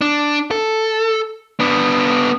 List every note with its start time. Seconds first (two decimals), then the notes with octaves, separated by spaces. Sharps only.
0.01 D4
0.51 A4
1.60 B3 D4